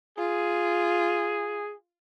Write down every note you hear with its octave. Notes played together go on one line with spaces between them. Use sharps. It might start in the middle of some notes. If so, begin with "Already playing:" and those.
F4 G#4